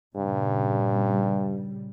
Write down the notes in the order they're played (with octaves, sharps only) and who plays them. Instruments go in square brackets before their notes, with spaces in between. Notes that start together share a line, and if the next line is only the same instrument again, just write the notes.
[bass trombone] G2 [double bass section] A#2 C#3 G3